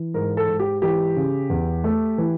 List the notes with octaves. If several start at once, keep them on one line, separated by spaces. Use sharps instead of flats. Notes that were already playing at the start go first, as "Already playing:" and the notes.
Already playing: E3
G#2 A#4
A4
G#2
G4
E3 G4
C#3
E2
A3
E3